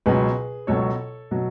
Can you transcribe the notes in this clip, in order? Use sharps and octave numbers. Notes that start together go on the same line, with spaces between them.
C#2 B2 F#3 G#4 B4
C#2 B2 F#3 A4 C#5
B2 F#3